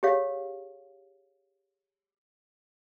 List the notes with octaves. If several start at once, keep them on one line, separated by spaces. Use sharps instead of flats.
G4 G#4 C#5 F5